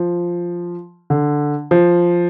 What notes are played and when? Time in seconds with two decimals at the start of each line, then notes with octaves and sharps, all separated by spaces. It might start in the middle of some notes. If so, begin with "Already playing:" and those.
Already playing: F3
1.10 D3
1.71 F3